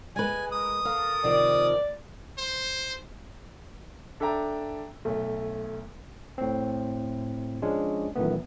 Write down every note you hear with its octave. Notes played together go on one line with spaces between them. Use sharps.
G#3 B4 G#5
A#4 D#6
A4 A#4 F5
C3 D#3 F3 D5
C5
D4 A4 E5 G5 A#5
B1 A3
A2 C4
F3 G#3 C#4 D4
F#2 A#2 D#3 E3 A3 B3